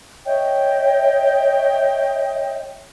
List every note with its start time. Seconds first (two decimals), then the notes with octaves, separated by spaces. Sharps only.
0.26 C#5 D#5 E5 G5